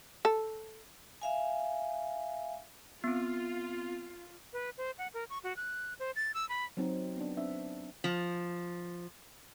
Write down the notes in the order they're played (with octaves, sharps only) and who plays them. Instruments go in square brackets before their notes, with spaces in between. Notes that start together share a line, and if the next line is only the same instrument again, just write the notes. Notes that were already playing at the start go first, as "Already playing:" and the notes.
[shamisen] A4
[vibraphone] E5 F5 G#5
[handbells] B3 C4 [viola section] F4
[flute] B4
C5
F#5
A#4
C#6
F#4
F#6
C5
A6
E6
B5
[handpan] F#3 C4 D#4
B3 D4
C4 D4 E5
[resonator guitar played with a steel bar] F3